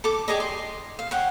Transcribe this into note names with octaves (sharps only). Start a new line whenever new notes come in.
A4 D6
G4 G#4 D5 D#5
C6
F5
C#5 F#5 G5